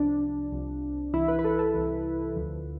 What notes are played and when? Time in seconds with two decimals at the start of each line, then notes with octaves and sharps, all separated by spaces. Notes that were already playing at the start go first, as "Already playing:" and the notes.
Already playing: C2 C3 F3 D4
0.52 C2 C3 F3
1.13 C2 C3 E3 E4
1.28 B4
1.39 B4
1.44 A4
1.59 A4
1.74 C2 C3 E3
2.35 D2 D3 F3